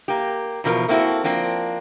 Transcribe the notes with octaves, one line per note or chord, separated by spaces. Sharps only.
A#3 G4
E2 B2 F3 A#4
A3 A#3 C4 E4 F#4 A4
F3 A#3 C4 D4